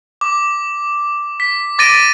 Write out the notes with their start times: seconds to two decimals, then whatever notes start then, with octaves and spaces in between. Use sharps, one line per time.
0.21 D6
1.40 B6
1.79 D6 A6 A#6 D7 D#7